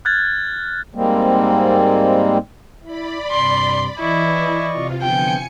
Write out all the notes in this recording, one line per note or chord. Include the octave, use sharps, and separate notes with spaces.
F6 F#6 G#6 A6
G#2 G3 G#3 A#3 C4
E4 D5 B5
G2 C3 C6
E3 E4 D5 D#5 C#6
C3 F4
D3 F3 B3 G5 G#5 C#7